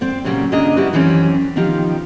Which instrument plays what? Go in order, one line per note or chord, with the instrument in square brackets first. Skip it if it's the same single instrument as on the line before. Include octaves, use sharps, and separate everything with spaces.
[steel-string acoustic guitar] C4 C5 D5
A#2 C#3 F#3 G3 A#3
D#2 C#3 A#3 D4 D#5 A#5
G3 E4 F#4 G4 B4
F#2 D#3 E3 G3 C4 C#4
B2 D#3 F3 D#4 F4 G4